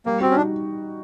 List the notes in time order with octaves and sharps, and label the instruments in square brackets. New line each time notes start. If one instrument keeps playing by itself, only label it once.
[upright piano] G3 [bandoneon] A#3
[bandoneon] C4 [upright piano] F#4
[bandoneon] C#4
[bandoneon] D4 [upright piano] D#4